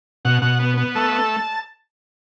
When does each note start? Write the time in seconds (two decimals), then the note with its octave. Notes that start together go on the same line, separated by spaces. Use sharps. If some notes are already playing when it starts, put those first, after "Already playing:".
0.25 B2 F#5
0.42 B2 F#5
0.60 B3
0.77 B3
0.95 A3 A5